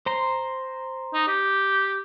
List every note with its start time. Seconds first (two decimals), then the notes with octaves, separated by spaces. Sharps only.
0.06 C5 A#5 C6
1.14 D#4
1.27 G4